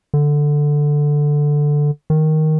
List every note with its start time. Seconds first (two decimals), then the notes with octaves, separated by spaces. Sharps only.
0.14 D3
2.10 D#3